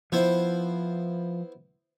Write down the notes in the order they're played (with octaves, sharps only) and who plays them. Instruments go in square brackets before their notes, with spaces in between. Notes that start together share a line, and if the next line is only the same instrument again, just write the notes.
[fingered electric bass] F3 [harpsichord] B3 E4 C5